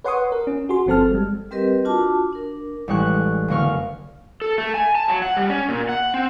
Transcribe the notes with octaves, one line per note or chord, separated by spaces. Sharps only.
B4 C#5 F#5 C6 C#6 D#6
A#4
C#4
F#4 G#4 C6
G1 F3 C4 A4 A5 F6
G3 G#3
G3 C4 G4 A#4 B4 D#5
D4 F4 F#4 A5 D6
D4 A#4
A1 G3 G#3 C#6 F#6
F#1 D3 A#3 C#6 F6
A4
A3
G#5
A5
F#3
F#5
G3
C#4
A#2
F#5
C4